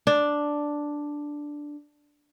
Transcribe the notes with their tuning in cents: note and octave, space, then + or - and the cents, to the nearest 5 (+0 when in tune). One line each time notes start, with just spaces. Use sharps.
D4 +0